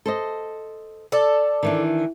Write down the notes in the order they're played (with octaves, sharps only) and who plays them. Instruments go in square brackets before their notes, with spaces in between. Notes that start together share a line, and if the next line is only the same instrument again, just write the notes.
[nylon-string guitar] A4 C5 D#5
[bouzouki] A4 D5
[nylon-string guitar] D#3 E3 D4